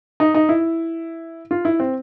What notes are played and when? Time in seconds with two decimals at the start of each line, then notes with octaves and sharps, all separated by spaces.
0.20 D#4
0.34 D#4
0.49 E4
1.51 F4
1.65 E4
1.80 C4